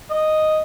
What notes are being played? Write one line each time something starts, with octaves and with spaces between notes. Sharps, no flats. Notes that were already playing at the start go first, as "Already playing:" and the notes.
D#5